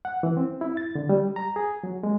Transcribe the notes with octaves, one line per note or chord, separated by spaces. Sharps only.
F#5
E3
C4
E4
A6
D3
G3
A#5
G#4
F#3
G#3